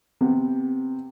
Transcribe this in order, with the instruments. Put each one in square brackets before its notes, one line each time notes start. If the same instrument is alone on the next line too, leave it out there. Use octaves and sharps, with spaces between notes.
[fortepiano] C3 B3